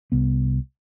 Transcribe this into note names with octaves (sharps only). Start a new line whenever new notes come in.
C2 B3